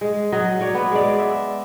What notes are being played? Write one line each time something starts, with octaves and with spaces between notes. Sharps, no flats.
G#3
F#3 D#5
F#3 C#5 D5
B3
G#3 D5
D5 E5